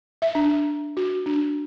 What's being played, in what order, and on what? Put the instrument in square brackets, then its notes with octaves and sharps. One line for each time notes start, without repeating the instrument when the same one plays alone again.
[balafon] E5
D4
F#4
D4